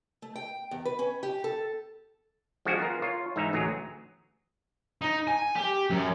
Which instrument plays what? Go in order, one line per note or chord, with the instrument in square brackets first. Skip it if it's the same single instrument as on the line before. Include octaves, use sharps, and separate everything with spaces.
[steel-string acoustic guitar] A3
G5
E2
B4
C#4
G4
A4
[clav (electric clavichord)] F3 G3 G#3 D4 F#4 G4
B3 F4 G#4 A#4
F4 C#5
G#2 E3 D#4 E5 A#5
A1 D2 F#3 G#4 A#5
[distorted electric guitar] D#4
G#5
G4
F#2